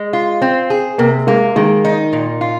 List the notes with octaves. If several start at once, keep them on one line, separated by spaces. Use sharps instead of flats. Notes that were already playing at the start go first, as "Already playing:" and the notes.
Already playing: G#3
F4
C4
G#4
C3 A#3
G#3 A#3
D#3 G#3
D#4
A#2
F4